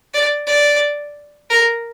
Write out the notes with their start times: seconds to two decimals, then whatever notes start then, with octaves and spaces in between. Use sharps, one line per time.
0.14 D5
0.47 D5
1.50 A#4